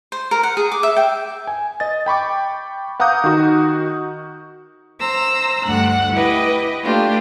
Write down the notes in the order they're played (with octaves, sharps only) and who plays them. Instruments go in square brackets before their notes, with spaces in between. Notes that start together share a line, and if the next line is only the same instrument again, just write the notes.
[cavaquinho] C5
A#4
F#5
G#4
D6
E5
G5
[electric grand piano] G#5
D#5 A6
G5 B5 C#6 D6
F5 F#5 A#5 D6 D#6 G6
D#3 D#4 F#4
[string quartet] C5 A#5 E6
D2 G2 G3 F#5 F#6
E4 G4 B4 D#5
A3 A#3 D4 F4 G4